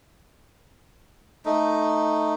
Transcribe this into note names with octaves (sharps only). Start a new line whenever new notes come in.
A3 D#4